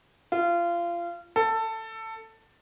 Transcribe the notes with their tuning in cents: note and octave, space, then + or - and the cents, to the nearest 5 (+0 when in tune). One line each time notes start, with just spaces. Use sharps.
F4 -25
A4 +15